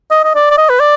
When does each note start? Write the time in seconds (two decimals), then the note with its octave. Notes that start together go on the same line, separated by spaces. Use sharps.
0.11 D#5
0.24 D#5
0.35 D5
0.51 D5
0.58 D#5
0.69 B4
0.80 D5